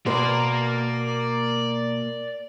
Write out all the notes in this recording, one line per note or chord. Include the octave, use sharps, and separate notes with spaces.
B2 A#3 A#4 C5 D5